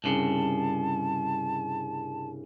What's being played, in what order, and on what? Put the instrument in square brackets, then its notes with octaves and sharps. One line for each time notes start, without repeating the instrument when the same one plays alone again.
[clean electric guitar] C2 G2 C#3 [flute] A5